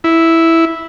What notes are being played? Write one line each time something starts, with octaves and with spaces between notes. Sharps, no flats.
E4